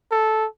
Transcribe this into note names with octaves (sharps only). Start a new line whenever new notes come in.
A4